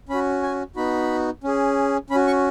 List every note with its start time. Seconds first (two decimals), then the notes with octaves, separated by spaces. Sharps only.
0.09 C#4 F#4 B5
0.43 G#5
0.76 B3 D#4 F#4 B5
1.44 C#4 G#4
2.10 C#4 B5
2.15 F#4
2.27 C#6